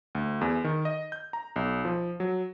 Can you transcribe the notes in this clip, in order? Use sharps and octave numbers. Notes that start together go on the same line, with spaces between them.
D2
E2
D#3
D#5
G6
A#5
B1
F3
F#3